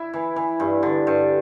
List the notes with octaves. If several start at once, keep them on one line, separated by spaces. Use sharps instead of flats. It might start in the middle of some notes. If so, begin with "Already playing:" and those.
Already playing: E4
E3
E3
G2
D3
G2